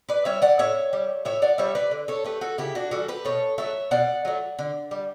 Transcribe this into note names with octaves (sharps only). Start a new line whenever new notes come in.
B4 D5
G3 C#5 E5
D5 F#5
A2 C#5 E5
G3
A2 C#5 E5
D5 F#5
G3 C#5 E5
B4 D5
D3
A4 C#5
A3 G4 B4
F#4 A4
C#3 E4 G4
D4 F#4
E3 G3 F#4 A4
G4 B4
B2 A4 C#5
F#3 A3 C#5 E5
B2 D5 F#5
F#3 A3
D3
G3